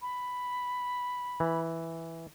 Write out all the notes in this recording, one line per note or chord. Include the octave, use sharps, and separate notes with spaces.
B5
E3